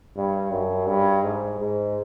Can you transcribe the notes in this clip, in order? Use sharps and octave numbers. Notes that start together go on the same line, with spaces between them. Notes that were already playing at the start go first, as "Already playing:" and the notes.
G2
F#2
G2
G#2
G#2